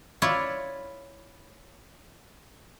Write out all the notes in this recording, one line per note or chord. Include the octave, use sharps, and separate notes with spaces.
E4 F4 C#5 D5 E5